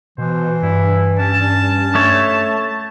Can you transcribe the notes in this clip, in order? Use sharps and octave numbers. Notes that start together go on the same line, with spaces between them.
B2 E3 C5
G2 E4
C#4 A5
A3 C#5